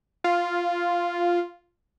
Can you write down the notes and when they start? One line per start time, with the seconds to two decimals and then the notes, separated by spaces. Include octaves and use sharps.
0.24 F4